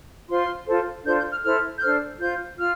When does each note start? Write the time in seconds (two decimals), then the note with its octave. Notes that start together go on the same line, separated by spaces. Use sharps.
0.29 F4 C5 C6
0.67 F4 A4 C5
1.05 D4 F4 A4 C5 G6
1.18 G6
1.31 F6
1.43 E4 A4 C5 F6
1.78 G6
1.82 D4 A4 C5 F6
2.20 F4 C5 G6
2.59 F4 F6